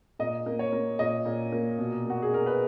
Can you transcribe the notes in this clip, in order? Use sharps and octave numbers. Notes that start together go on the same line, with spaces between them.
A#2 D#5
A#3
C#5
A#3
A#2 D#5
A#2
A#3
B2
A#3 F#4
G#4
A#3 A#4
B4